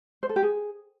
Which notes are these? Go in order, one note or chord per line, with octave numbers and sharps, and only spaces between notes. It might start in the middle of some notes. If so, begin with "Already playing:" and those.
C5
A4
G4
G#4